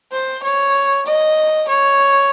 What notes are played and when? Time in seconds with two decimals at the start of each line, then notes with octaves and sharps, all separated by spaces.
0.12 C5
0.43 C#5
1.06 D#5
1.69 C#5